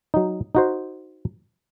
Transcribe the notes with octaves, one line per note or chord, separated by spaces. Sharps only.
F#3 D#4
D#4 F#4 C5